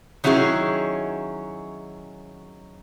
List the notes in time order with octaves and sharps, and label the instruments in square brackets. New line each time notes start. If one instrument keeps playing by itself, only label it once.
[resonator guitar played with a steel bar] D#3 F#3 C#4 E4 G#4